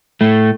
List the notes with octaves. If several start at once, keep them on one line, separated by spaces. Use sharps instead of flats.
A2 A3